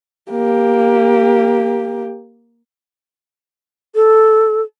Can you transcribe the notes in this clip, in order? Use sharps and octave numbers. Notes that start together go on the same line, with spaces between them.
A#3 G4
A4